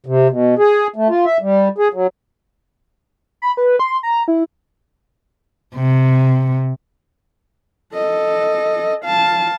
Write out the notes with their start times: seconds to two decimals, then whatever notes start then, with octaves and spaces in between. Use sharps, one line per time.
0.06 C3
0.30 B2
0.59 G#4
0.96 A3
1.09 F4
1.25 E5
1.42 G3
1.78 G#4
1.93 F#3
3.42 B5
3.57 B4
3.79 C6
4.03 A#5
4.28 E4
5.76 C3
7.94 A4 D#5
9.05 F5 A5